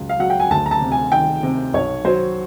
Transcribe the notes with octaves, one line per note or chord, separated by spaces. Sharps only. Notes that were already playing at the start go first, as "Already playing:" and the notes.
Already playing: C#2 F#3
F5
F#3 F#5
G5
G#5
D2 A5
A#5
A5
C3
G#5
D#3 G5
C3
B1 C#5
F#3 C5